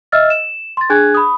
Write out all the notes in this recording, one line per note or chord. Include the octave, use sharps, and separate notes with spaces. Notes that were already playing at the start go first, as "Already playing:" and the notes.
D#5 E5 E6 F6 A6
E7
C6 A6
D4 G#4 G#5 F#6 G#6
B5 D#6